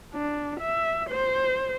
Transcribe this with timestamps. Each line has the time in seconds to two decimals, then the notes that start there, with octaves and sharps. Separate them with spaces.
0.14 D4
0.60 E5
1.10 C5